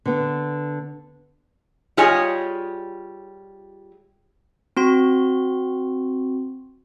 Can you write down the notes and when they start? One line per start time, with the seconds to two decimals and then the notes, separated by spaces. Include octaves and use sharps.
0.05 D3 B3
1.97 G3 F4 G#4 C#5 D#5 G#5
4.77 C4 F#4 C6